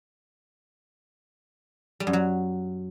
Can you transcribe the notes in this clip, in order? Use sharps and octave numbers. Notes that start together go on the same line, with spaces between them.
G3
F#2
F#3